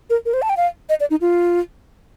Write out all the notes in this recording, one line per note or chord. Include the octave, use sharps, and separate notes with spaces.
A#4
A#4
C5
A5
G5
F5
D#5
D5
D#4
F4